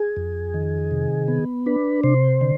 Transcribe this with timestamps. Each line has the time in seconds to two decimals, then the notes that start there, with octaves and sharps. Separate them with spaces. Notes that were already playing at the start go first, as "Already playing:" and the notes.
Already playing: G#4
0.17 F2
0.54 D#3
0.91 C3
1.28 B3
1.66 D4 B4
2.03 C3 C5
2.41 D3